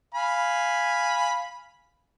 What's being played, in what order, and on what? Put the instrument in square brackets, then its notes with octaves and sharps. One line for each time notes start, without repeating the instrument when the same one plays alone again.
[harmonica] F5 G#5 B5